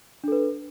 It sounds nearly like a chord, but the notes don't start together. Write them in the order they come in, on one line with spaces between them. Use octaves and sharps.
D4 A4 B4